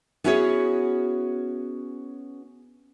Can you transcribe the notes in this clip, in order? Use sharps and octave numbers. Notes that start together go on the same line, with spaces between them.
B3 C#4 E4 F#4 G#4 C#5